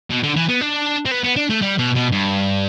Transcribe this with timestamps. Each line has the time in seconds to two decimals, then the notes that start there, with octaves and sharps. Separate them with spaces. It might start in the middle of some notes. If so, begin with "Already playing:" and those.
0.11 B2
0.23 D3
0.36 E3
0.49 B3
0.61 D4
1.06 C4
1.11 B3
1.24 B3
1.36 D4
1.50 A3
1.62 G3
1.78 B2
1.95 B2
2.12 G2